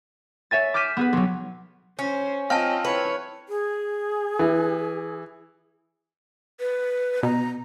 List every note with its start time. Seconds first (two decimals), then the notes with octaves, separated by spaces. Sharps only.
0.51 C#5 E5 G#5 A6
0.74 D6 F6 G6 B6 D#7 E7
0.97 B3 G#4 B4
1.13 B1 F#3
1.99 C#4 C5
2.50 C4 F4 D#5 F5 G5 A5 F6
2.85 E4 B4 C#5
3.49 G#4
4.39 E3
6.60 B4
7.23 B2 A#5